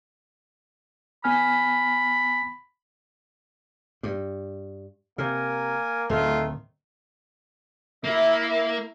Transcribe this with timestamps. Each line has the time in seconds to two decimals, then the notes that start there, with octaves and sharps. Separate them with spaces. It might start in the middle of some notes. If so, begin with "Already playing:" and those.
1.24 B3 G#5 B5 F6
4.03 G2
5.18 C3 A#3 A#4 G#5
6.09 D1 D#3 A3 F4
8.04 A#3 E4